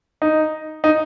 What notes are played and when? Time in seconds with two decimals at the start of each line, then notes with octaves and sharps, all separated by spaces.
0.22 D#4
0.84 D#4